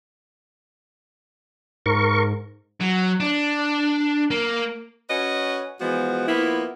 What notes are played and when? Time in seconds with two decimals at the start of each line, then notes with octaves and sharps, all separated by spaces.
1.86 G#2 A#4 C#6
2.81 F#3
3.20 D4
4.31 A#3
5.09 C#4 F#4 B4 C#5 D#5
5.79 E3 F3 G#3 B3 F#4
6.27 F3 A#3 B3 E4